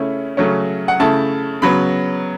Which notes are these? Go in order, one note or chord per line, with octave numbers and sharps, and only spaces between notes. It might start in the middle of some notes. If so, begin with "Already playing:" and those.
Already playing: C#3 A3 C#4 E4
C#3 F#3 A3 C#4
F#5
C#3 A3 E4 A5
C#3 F#3 B3 B5